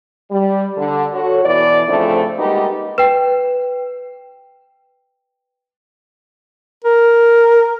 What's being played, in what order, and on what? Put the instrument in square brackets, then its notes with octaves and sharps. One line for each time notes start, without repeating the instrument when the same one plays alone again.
[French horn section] G3
D3
F#4 A4 C#5
B2 E3 D5
A2 C#3 F3 A3 C4 D4
G3 G#3 A#3 B3 D#4 G4
[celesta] B4 G5
[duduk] A#4